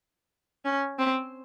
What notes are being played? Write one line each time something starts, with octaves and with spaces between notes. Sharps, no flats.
C#4
C4